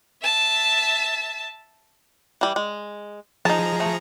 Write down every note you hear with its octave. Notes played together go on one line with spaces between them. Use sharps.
E5 A5
E3 G3
G#3
F3 D#4 G#4 A5 A#5
A3